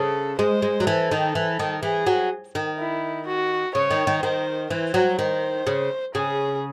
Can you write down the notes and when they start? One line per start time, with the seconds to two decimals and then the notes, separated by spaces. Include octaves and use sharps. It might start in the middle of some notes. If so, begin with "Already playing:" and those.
Already playing: C#3 A4
0.39 G#3 C5
0.62 G#3
0.80 F#3
0.87 E3 A4
1.11 D#3
1.35 E3
1.59 D#3
1.83 E3 G#4
2.07 F#3
2.55 D#3
2.78 E4
3.27 F#4
3.75 C#3 C#5
3.91 D#3
4.07 D#3
4.22 D#3 C5
4.70 E3 C5
4.94 F#3
5.19 D#3 C5
5.67 C#3
6.15 C#3 G#4